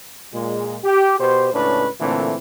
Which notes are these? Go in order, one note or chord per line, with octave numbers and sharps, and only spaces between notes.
A#2 G#3
G4
B2 G4 C5
C#2 A2 C#4 D4 B4
A#2 D3 E3 A3 C4